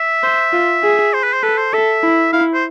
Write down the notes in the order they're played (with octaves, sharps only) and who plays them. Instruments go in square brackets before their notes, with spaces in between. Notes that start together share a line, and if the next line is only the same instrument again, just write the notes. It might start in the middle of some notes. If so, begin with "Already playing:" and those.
Already playing: [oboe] E5
[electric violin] C5
F4
G#4
[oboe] C5
B4
C5
[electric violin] A4 [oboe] B4
[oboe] C5
[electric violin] A4 [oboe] E5
[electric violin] E4
[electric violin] E4 [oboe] F5
[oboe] C5